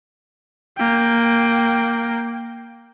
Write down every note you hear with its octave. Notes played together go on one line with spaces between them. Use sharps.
A#3 G5